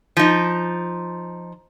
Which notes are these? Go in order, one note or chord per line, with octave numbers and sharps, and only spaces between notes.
F3 D#4